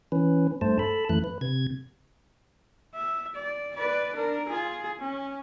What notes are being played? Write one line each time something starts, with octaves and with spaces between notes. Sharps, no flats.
E3 C#4 B4
G2 A3 C5 A5
A4 A5 B5
F#2 E3 A3 F#6
B4
C3 G#6
E5
D5
B4 D5
D4 A#4
F4 G#4
C#4